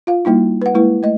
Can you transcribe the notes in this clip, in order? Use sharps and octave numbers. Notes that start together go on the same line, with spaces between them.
F4 F5
G3 A#3 D#4 E4
B4 F#5
G#3 A#3 E4 B4
A3 D#5